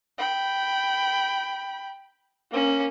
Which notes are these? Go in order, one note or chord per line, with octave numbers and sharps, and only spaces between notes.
G5 B5
A#3 C#4